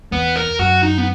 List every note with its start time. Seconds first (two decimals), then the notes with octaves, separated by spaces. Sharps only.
0.12 E2 B3
0.36 A#4
0.59 F#2 F#4
0.83 D#4
0.98 B3